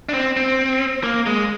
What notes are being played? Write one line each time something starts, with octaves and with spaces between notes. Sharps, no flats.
D4
C4
C4
A#3
G#3